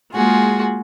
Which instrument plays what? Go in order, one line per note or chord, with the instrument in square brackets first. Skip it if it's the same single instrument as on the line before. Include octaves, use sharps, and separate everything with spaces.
[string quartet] G#3 A#3 F4 F#4 G#4